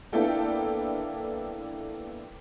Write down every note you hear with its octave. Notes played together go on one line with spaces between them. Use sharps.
A#3 B3 D4 E4 A4 G5